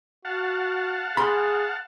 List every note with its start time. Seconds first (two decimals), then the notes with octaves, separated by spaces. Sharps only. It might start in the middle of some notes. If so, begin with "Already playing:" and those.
0.25 F#4 F5 F#5 A5
1.17 G#4 B5 C6